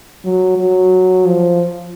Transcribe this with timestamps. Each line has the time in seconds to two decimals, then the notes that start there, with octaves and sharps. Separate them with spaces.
0.25 F#3
0.58 F#3
1.27 F3